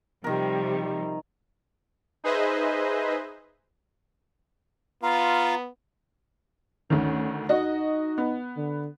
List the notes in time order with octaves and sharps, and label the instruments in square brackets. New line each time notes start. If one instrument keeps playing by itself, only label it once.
[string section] C3 F3 G3 [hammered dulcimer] D#3 A#4
[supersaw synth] D#4 G#4 B4 C5 D#5 E5
[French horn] B3 [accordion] F4 F5 [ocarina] A#5
[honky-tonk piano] D2 D#3 [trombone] C#4
[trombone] D#4 [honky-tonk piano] F#4 D#5
[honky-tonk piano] B3
[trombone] D3